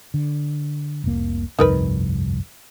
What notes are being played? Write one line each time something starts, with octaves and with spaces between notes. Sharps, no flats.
D3
F1 C2 A#3
G1 C2 F2 D#4 A#4 B4